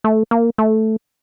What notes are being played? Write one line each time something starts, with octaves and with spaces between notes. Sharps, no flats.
A3
A#3
A3